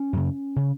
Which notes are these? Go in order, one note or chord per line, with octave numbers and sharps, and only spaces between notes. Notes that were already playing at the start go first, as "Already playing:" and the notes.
Already playing: C#4
F#2 C#3
C#3